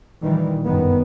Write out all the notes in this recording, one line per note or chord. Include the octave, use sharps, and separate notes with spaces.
A#2 D#3 E3 G3
G1 F#2 D#3 B3